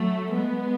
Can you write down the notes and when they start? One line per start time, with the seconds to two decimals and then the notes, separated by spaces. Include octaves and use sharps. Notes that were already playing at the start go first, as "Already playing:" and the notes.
Already playing: F#3 A3
0.33 G#3 B3